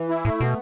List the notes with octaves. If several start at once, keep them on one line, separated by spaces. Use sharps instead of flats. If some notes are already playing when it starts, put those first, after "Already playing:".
Already playing: E3
E4
A2 A3
B2 B3